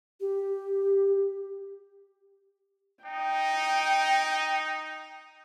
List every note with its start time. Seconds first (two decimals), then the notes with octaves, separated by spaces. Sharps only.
0.20 G4
3.04 D#4 G5